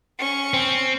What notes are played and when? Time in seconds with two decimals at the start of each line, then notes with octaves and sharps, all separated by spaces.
0.19 C#4 C#6
0.54 C4